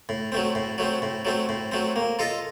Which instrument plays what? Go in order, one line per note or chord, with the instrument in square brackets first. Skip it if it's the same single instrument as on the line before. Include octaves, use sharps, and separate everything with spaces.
[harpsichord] A2
F#3 A3 C4
A2
F#3 A3 C4
A2
F#3 A3 C4
A2
F#3 A3 C4
A#3
F4 A4 D#5